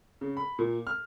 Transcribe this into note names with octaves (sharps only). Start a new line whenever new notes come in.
C#3
B5
A#2
F6